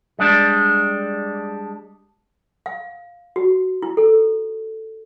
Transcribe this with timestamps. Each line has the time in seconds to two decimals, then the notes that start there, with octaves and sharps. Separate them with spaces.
0.19 G3 G#3 D4
2.66 F5
3.36 F#4
3.82 E4
3.97 A4